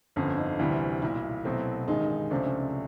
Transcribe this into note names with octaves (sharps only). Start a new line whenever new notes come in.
G1 F2 D3 C#4
D#4
D2 C3 E3 G3 E4
B1 A#2 G3 E4
C2 B2 F#3 A3 C4
A1 G2 D#3 G#3 D#4
D#4
C#2 C3 F3 A3 C#4 D4
C#4
C#4